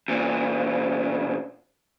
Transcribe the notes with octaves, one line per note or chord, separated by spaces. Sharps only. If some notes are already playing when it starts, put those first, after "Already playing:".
E2 A#2